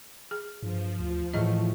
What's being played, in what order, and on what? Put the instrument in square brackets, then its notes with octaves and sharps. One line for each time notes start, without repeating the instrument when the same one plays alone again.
[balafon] G#4
[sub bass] G2 [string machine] F3
[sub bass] D2
[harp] A2 A3 [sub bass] E3 [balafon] G#4 D#5